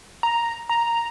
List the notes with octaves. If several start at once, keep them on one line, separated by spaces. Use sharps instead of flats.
A#5
A#5